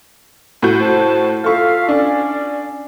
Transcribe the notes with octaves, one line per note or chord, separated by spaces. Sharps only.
A2 F#4 G6
C5 A5
F4 A4 E5 F5 C#6
C#4 D4 D5